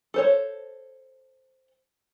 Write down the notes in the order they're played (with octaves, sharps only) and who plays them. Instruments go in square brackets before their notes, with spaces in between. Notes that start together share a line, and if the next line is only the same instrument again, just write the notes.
[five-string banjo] A4 C5 C#5